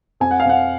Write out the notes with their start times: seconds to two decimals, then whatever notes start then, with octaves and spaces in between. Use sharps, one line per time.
0.20 F2 G#5
0.31 F#5
0.40 F5
0.45 F2 F#5